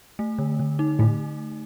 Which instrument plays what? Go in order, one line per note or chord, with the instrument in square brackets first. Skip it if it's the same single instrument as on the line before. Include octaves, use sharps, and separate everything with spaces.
[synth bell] A3
D3
D3
D#4
[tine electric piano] A2 [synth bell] A3